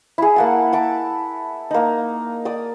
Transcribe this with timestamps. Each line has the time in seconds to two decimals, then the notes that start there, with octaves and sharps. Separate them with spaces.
0.18 E4 G#4
0.36 A#3 F#5 A5
0.73 A5 D6
1.71 A#3 D#4
2.45 D5 D#6